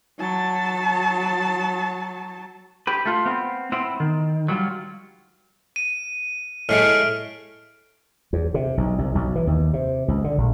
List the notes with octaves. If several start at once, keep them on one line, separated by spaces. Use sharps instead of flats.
F#3 A5
G4 B4
A3 F4
B3 C4
B3 C4 E4
D#3
F#3 G3 F4
D#7
A2 G#3 A3 F6 D7
E2
C3
B1
C2
B1
E3
D#2
C3
C#2
D3
A#1